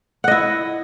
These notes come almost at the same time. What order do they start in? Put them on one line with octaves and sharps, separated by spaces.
F#5 D#5 E4